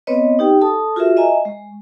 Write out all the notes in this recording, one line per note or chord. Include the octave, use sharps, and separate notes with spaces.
B3 C4 B4 C#5 D#5
D#4 G4 G5
A4 A5 D#6
F4 F#4 G#4 A#4 E5
D#5 E5 G#5 A#5
G#3